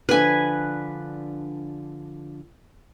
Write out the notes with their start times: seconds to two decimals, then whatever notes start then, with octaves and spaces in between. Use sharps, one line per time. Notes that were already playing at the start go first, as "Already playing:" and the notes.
0.09 D3 F3 D4 B4 G#5